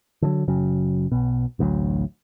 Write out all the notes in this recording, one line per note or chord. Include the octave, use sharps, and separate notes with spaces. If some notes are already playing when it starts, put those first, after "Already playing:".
D3 E3 F#3
F#1 C#3 F#3
B1 B2
A1 D2 D3 F#3